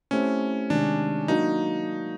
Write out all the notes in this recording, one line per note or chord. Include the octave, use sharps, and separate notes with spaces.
A3 C4 C#4 E4 G4 C5
C3 D#3 G#3 D4
F#3 A#3 D4 D#4 F#4